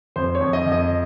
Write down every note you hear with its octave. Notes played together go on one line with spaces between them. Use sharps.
F2 C5
C#5
F2
D#5
F2
D#5